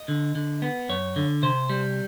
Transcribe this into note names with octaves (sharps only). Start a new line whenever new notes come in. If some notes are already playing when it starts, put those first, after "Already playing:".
Already playing: D#5
D3
D3
B3
F#2 C#5
D3
C3 C5
G3